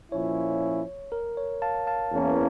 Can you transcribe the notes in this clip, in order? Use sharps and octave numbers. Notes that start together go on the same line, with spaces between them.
A#2 F3 C#4 E4 C#5
A#4
C#5
F5 A5
F5 A5
E2 E3 A#3 C#4